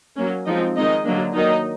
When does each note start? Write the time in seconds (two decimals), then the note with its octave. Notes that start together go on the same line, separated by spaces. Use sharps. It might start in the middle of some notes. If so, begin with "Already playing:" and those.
0.16 F#3 A#3 C#4
0.46 F3 G#3 C4 D#4 D#5
0.75 D#3 G#3 C4 D#4 D#5
1.05 D3 F#3 A#3 D4
1.34 D#3 F#3 A#3 D#4 D#5